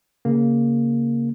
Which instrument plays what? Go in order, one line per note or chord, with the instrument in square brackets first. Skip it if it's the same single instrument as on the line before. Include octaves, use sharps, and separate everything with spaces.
[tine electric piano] C#3 A#3